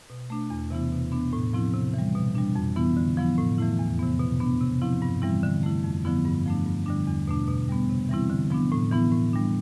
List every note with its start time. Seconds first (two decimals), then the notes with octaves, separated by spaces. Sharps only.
0.10 B2
0.30 A3 D4
0.50 E2
0.70 C3 E3 B3 E4
0.92 B2
1.12 B3 D4
1.33 A2
1.53 F3 C4 E4
1.74 C3
1.94 E3 G3
2.15 B2
2.35 G3 D4
2.55 F2
2.76 E3 B3 E4
2.97 D3
3.17 F3 B3 E4
3.38 A2
3.58 E3 A3 E4
3.79 E2
3.99 C3 E3 B3
4.19 B2
4.40 B3 D4
4.61 C3
4.82 F3 C4 E4
5.02 G2
5.22 E3 G3 C4 E4
5.43 D3
5.63 A3 E4
5.84 F2
6.05 D3 F3 B3 E4
6.25 G2
6.46 F3 A3 D4
6.66 G2
6.86 D3 G3 D4
7.07 E2
7.28 B2 A3 D4
7.48 B2
7.69 G3 B3
7.89 C3
8.09 E3 G3 C4 E4
8.30 D3
8.50 F3 B3 D4
8.72 A2
8.92 E3 B3 E4
9.12 A2
9.33 G3 D4